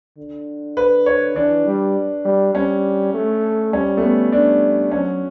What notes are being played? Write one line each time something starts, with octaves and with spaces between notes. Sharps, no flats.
D3
B4
C#5
E3 D4
G3
G3
G3 C#4
A3
G3 C#4
A3
B3
G3 D4
F#3 C#4